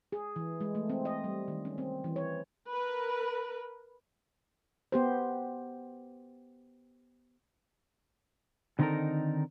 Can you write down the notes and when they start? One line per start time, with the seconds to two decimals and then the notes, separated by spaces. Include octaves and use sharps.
0.12 G#4
0.36 E3
0.61 G#3
0.75 A3
0.89 C4
1.05 D#5
1.24 G3
1.48 D#3
1.65 C#4
1.78 C4
2.04 E3
2.16 C#5
2.68 A#4 B4
4.92 B3 G4 C5
8.79 D3 D#3 C4 D#4 A4 A#4